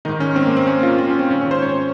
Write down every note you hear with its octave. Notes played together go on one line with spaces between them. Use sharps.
G#2 D#3 D#4
C#4
C4
A#3
C4
C#4
F4
C4
C#4
C4
G#2 D#3 C#4
C#4
C5
C#5